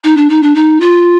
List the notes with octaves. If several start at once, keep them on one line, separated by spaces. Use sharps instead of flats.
D#4
D4
D#4
D4
D#4
F4